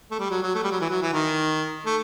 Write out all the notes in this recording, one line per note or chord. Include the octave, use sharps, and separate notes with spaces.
A3
G3
F#3
F#3
A3
G3
F#3
E3
F#3
E3
D#3
A3